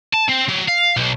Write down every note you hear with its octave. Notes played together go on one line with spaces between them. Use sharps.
A5
C4
F#3
F5
B1